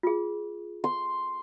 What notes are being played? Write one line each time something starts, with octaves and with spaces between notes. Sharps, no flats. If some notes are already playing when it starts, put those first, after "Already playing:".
F4 G#4
C6